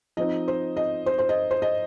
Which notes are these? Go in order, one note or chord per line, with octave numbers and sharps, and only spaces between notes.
F3 C4 D#4 D#5
C5
D#5
C5
C5
D#5
C5
D#5